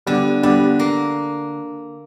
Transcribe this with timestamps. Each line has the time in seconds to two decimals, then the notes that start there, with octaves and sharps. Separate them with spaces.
0.07 D3 G3 B3
0.43 D3 G3 B3
0.79 A#3